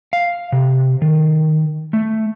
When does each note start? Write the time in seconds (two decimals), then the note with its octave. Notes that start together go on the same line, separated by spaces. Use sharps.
0.13 F5
0.52 C3
1.02 D#3
1.93 A3